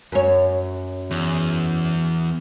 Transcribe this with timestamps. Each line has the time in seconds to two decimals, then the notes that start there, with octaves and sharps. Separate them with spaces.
0.12 F#2 C#5
1.11 E2